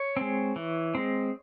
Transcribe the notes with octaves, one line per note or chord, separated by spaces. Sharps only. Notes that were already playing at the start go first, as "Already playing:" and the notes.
Already playing: C#5
G#3 C4
E3
G#3 C4